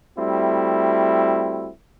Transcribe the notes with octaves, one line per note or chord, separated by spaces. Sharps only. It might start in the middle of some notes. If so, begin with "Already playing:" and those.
G3 A3 C4 E4 F#4